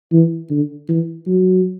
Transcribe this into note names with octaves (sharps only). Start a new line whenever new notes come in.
E3
D3
E3
F#3